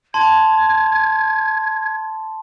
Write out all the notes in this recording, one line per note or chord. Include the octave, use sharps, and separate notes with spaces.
A5 C6 G#6